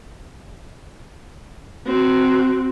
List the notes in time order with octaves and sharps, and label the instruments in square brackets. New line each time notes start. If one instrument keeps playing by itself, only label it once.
[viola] C4 F#4